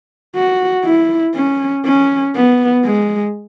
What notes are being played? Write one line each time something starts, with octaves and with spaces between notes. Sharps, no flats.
F#4
E4
C#4
C#4
B3
G#3